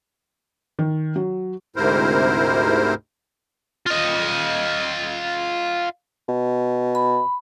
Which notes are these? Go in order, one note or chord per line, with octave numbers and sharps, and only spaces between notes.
D#3
F#3
D2 G#2 C3 E4 A#4 C5
F4 D#5
B2
B5